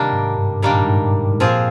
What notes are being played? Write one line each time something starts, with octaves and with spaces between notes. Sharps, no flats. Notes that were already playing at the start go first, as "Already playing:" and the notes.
Already playing: C3 D#3 G3 A#3 D4
G#2
G2
A#2 D#3 G3 A#3 D4
G#2
G2
G#2
G#2
A#2 F3 C4 F4 G#4